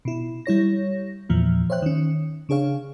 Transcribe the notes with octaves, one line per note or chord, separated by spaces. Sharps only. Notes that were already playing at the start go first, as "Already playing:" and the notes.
B2 E4
G3 E4 C#5 A#6
E2 A#2 E3 F3
C5 C#5 E5 G5 F#6
D#3 C#4
C#3 D4 G#4 C#5 F5